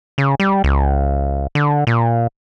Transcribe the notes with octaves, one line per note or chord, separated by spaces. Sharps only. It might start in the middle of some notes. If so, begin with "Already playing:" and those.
C#3
G3
C#2
D3
A#2